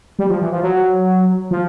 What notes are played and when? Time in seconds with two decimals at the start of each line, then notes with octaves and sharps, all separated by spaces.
0.19 G3
0.30 F3
0.41 E3
0.52 F3
0.63 F#3
1.51 F3